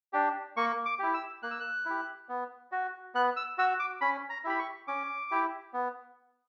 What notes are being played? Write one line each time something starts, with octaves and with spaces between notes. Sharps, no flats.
D4 G4
A#3 C#6
D6
E4 G4
E6
A#3 F#6
E6
F#6
E4 G4
B3
F#4
B3 F#6
E6
F#4 E6
D6
C#4 B5
A#5
E4 G4 B5
C#6
C#4 D6
E4 G4
B3